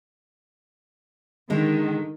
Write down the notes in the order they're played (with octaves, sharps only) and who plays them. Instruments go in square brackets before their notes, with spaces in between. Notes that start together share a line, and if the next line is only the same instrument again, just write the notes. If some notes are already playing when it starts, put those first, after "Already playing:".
[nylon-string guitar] D3 G#3 [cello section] D#3